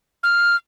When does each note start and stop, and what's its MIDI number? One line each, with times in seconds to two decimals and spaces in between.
0.23 0.56 89